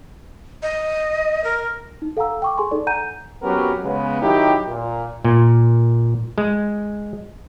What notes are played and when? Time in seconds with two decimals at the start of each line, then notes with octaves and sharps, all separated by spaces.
0.62 D#5
1.44 A#4
2.02 D#4
2.17 A4 F5 F#5 G#5 A#5 E6
2.42 G5 C#6 D6
2.57 G#4 A4 G#5 C6 C#6
2.71 D#4 A4 D5
2.87 F#5 G#5 A#5 G6 D#7
3.42 F2 F#3 B3 C#4 G4 A#4
3.83 C#3 G#3 B3
4.22 D#3 F#3 D#4 E4 G4
4.68 A#2
5.24 A#2
6.38 G#3